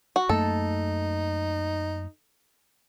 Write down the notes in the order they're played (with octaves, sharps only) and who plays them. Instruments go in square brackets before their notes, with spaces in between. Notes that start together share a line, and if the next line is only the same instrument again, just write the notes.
[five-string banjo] F#4
[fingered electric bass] F#2 A3 A#3 [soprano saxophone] D#4 [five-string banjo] A4